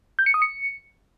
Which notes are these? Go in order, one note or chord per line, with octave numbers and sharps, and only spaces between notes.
G6
C#7
D#6
C#7